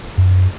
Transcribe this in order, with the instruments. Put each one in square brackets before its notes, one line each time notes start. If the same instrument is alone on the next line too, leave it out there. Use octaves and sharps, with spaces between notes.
[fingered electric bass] F#2